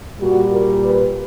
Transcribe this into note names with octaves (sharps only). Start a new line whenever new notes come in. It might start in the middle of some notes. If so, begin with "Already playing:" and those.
A#2 G3 F#4
A#4
B4